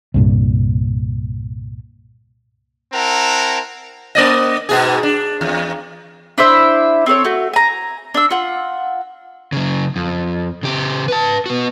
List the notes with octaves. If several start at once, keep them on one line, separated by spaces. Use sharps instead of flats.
C2 G2 A#2
C4 E4 A#4 F#5 A5 A#5
A#3 D5 D#5
G#2 B2 G#4
D4
E2
D4 E4 C5 E5
C4 A4 C5 C#5
A3 F#4
G#5 A#5
D4 E6
F4 F#5
C#3 F#3
F2
C#3 G4
B4 A5
B3 F#4